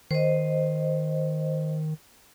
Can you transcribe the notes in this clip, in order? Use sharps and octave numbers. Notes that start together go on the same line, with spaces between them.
D#3 C5 D#5